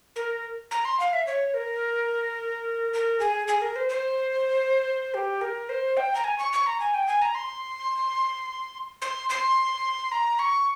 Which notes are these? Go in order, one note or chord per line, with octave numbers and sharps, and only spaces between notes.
A#4
A#5
C6
F5
E5
C#5
A#4
A#4
G#4
G#4
A#4
C5
C5
G4
A#4
C5
G5
A#5
G#5
C#6
C#6
A#5
G#5
G5
G#5
A#5
C6
C6
C6
A#5
C#6